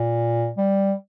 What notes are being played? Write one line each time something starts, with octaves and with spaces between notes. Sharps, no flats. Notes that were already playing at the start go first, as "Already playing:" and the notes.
Already playing: A#2
G3